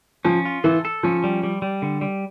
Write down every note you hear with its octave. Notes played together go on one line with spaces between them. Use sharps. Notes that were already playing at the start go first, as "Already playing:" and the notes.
F3 C#4
F4
E3 A4
A4
F3 C#4
G3
G3
G3
D3
G3